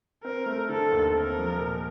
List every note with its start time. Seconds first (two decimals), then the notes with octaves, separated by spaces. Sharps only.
0.24 C4 A#4
0.46 A3
0.69 D3 A4
0.92 D#2
1.15 C4 A#4
1.38 F3
1.60 A#2